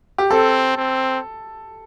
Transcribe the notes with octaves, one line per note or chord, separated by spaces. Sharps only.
G4
C4 A4
C4